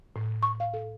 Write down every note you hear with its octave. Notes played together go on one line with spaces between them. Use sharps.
A2
C#6
F5
A4